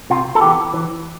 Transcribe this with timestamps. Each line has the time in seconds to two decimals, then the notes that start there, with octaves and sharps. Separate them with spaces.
0.10 C3 F4
0.35 A4
0.41 E3 B3 G4
0.74 E3